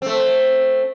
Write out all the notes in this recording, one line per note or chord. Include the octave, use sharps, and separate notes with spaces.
A3 C4